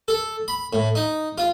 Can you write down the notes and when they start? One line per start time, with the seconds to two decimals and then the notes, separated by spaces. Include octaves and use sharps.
0.08 A4
0.48 B5
0.73 A2
0.95 D#4
1.38 F4